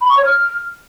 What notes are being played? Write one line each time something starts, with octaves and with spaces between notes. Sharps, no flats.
B5
C#6
C#5
F6